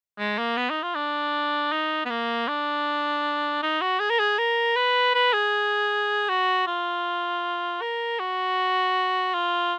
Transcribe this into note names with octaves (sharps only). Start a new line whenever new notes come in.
G#3
A#3
B3
D#4
F4
D4
D#4
B3
A#3
D4
D#4
F#4
G#4
A#4
G#4
A#4
B4
B4
G#4
F#4
F4
A#4
F#4
F4